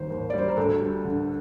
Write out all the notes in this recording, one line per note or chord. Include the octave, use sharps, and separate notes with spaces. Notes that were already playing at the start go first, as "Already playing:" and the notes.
Already playing: D#2 D#3 G3 C5
D#2
G3 D5
C5
A#4
D2 A4
G3
D3